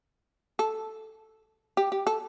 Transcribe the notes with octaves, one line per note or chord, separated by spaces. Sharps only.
A4
G4
G4
A4